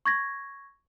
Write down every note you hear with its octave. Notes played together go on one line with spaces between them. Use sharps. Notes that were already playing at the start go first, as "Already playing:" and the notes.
C#6 G#6 A#6